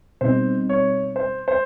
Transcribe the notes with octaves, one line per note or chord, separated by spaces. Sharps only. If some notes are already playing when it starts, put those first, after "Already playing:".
B2 G3 C4 D#4 C5
C#5
C5
C5